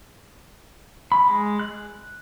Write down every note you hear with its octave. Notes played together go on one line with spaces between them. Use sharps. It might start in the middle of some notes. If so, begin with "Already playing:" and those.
B5
G#3
F#6